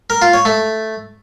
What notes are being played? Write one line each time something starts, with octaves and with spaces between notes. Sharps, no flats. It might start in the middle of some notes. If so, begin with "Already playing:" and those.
A#4
F4
C#5
A3